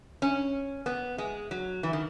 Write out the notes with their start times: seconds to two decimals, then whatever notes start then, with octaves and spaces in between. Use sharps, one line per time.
0.22 C#4
0.86 B3
1.18 G#3
1.51 F#3
1.83 E3
1.93 D#3